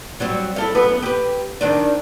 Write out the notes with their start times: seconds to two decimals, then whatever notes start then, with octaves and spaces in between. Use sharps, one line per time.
0.20 F#3 G3 C4
0.56 E4 A4 F5
0.75 F#2 B3 B4
1.02 G4 B4
1.61 D#3 C4 D4